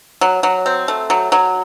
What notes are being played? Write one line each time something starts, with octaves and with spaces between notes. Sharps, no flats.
F#3
F#3
C4
A3
F#3
F#3